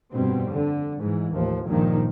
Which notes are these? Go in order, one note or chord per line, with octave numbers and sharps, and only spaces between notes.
F1 G2 B2 G3 C4
D3
G#2 E3
A1 D#2 F3
C#2 G2 A#2 D#3 F3